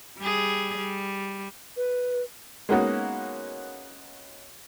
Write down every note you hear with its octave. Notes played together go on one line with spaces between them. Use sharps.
G3 G#4
G3
B4
G#3 A#3 B3 C#4 D#4 F#4